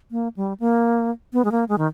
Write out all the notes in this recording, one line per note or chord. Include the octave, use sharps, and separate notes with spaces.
A#3
G3
A#3
B3
G#3
A#3
G#3
D#3